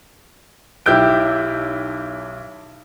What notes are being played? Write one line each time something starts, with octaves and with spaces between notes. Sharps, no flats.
B1 E4 G4 E6 G6 D7